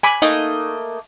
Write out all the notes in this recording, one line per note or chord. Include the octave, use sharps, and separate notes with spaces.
G#5 B5 D6
A3 A#3 D#4 D#5